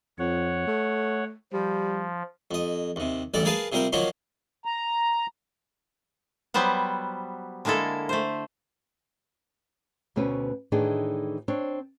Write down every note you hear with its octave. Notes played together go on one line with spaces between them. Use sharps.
F2 C#5 F#5
A3
F3 G3
F2 D#5
D#2 C3
A1 D2 G3 A4 D5
G#4 A#4 B4 F5 G#5 A5
C3 F3 G3 C4 A#4 C5
D#3 F3 F#3 A#3 C#4 F4
A#5
F#3 G3 B3 C5 F#5
D3 G#3 A#3 E4 A4
A3 C5
D2 B2 C4 C#4 B4
A2 D#3 E3 D4 D#4 G#4
C4 D4 C#5